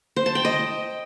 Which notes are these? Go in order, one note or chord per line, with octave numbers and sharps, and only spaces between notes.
C5
A5
G5
D#5